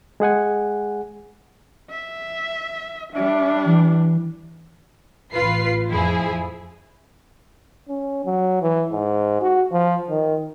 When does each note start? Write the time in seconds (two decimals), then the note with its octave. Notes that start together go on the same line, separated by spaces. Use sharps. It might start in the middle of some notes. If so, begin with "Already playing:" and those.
0.20 G#3 G#4 F#5 G#5
1.90 E5
3.13 G3 D4 E5
3.66 E3
5.34 A1 F4 B4 C7
5.89 F2 F3 E4 G#4
7.89 C#4
8.25 F#3
8.62 E3
8.92 G#2
9.41 F#4
9.72 F3
10.10 D#3